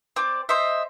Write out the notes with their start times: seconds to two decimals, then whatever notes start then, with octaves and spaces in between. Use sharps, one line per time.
0.16 C4 D5
0.49 C5 D#5 E5